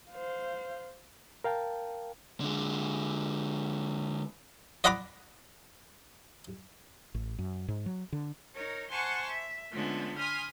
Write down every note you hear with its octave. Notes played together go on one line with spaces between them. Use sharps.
C5 F5
A#4 F5 G5 A5
D3 G#3
D5 D#5 F#5 A#5 B5 D6
A1
F#2
G#2
F#3
D3
D#4 A#4 C#5
C5 F#5 G#5 A5 C6 C#6
E5
D3 F3 G#3 A3 B3 C#4
G#5 B5 C6 D#6 F6